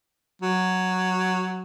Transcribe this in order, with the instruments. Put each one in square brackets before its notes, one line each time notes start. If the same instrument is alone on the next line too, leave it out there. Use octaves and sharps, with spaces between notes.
[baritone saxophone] F#3